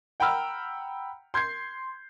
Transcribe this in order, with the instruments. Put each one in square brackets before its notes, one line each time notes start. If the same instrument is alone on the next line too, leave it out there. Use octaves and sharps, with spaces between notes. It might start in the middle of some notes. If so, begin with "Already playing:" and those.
[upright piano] F#5 G5 A#5 B5 E6 F6
C6 G6 G#6 C7